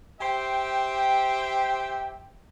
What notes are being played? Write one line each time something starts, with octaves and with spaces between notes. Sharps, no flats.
G4 C5 E5 G5